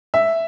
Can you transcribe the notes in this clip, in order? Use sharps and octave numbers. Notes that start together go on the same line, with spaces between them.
E5